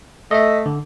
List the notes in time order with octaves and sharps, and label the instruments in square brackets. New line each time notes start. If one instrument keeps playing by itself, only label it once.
[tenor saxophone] A3 [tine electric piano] D#5 E5
[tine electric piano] D3